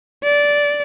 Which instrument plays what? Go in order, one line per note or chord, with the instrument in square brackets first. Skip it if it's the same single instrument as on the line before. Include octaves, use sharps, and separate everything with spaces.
[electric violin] D5